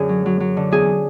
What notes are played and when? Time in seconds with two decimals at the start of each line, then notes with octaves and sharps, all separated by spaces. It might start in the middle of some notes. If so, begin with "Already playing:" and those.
Already playing: F#2 D3 G#4
0.09 F#3
0.26 F#3
0.40 F#3
0.57 D3
0.72 E2 G#4